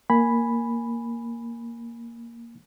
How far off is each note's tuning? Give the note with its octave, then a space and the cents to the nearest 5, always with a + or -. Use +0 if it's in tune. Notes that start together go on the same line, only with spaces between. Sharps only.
A#3 +0 G#5 +0 B5 +0